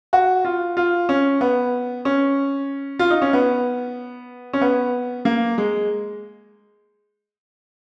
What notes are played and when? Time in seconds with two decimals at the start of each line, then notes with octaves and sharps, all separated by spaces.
0.13 F#4
0.45 F4
0.77 F4
1.09 C#4
1.41 B3
2.05 C#4
2.99 F4
3.10 D#4
3.22 C#4
3.33 B3
4.53 C#4
4.61 B3
5.25 A#3
5.58 G#3